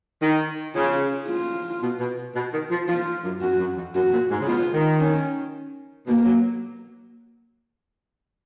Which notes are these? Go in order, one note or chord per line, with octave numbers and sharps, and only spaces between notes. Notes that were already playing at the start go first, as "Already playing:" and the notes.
D#3
C#3 F4
F4
B2
B2
B2
D#3
F3
F3 F4
F#2
F#2 F#4
F#2
F2
F#2 F#4
A#2
G#2
C#3
B2 F4
D#3
C#4
B2 A#3
F#3